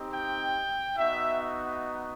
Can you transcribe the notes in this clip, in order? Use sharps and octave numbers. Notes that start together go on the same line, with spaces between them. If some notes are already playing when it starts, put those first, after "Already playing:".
Already playing: C4 D#4 G4
G5
B3 D#4 F#4 E5